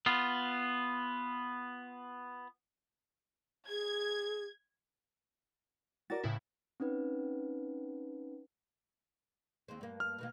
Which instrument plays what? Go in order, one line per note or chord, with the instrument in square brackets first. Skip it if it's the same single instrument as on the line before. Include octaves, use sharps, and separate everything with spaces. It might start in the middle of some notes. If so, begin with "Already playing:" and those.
[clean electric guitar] B3 F4
[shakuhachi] G#4 [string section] G#6
[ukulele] F#4 A#4 D5 [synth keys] A6
[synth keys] A2 C#3 E4 [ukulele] B4
[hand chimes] C4 C#4 D#4 B4
[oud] D#2 G#3 C4
G2 A#3
[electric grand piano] F6
[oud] B2 D#3 A#3